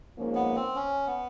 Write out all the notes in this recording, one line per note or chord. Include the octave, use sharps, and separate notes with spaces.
G#2 F3 A#3 C#4
B3
C4
C#4
B3